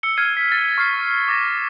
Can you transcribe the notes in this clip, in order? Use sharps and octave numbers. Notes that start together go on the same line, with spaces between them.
E6 C#7 G7
F6 G#6 C7 C#7 D#7
B6
A6
C#6 F6 B6 C7
D6 A6 A#6 D#7 E7